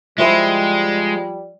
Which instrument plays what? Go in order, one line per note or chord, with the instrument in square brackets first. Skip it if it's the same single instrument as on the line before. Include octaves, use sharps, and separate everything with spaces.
[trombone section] F3 G3 [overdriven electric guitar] G#3 [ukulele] E4 C5 E5